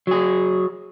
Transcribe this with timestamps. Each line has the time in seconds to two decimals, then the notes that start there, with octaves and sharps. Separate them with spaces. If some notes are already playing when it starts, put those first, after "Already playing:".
0.07 F#3 G#4